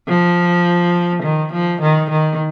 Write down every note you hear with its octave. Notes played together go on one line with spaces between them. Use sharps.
F3
D#3
F3
D#3
D#3